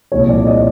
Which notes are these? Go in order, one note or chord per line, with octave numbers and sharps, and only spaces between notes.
C2 A#2 F3 C#5
D5
D#5